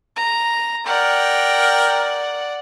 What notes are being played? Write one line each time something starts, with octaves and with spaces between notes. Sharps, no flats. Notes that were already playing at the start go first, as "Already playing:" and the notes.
A#5
A#4 D5 F#5 G5